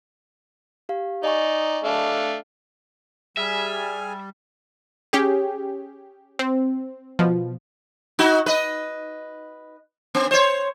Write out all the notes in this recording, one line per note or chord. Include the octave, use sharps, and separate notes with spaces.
G4 F5
D#4 D5 D#5 G#5 C#6
A3 D4 F5
G3 G#4 E5 G#5 F6
C#4 G4 G#4
C4
B2 F3
D#4 F#4
B4 D#5
B3
C5 C#5